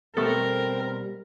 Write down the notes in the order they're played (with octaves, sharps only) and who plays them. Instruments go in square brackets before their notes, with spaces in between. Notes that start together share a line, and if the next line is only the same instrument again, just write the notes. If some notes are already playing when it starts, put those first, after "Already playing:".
[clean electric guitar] B2 G3 [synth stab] A3 B3 A4 [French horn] C4 [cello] A#4